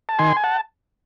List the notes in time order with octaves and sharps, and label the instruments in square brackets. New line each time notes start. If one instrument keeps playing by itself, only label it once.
[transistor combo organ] A5
D#3 G#5 C6
G#5
F#5 A5